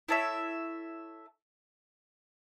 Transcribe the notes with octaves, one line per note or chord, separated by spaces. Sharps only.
E4 A4 C#5 E5